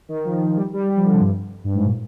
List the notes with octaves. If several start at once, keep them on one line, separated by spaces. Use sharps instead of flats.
D#3
F3
G3
G3
G3
F3
D3
C3
G2
G2
G#2
A#2